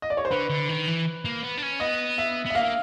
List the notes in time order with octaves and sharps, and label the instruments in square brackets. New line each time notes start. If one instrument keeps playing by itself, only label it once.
[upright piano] D#5
D5
C#5
C5
[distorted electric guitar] D3 [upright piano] B4
[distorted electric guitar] D3
D#3
E3
A#3
B3
D4
C#4
[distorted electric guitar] B3 [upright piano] D#5
[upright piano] E5
[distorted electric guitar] B3 [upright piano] E5
[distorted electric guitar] A#3 [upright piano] F5